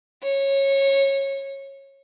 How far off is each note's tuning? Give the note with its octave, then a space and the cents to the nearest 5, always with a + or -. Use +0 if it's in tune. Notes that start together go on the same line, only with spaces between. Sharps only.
C#5 -20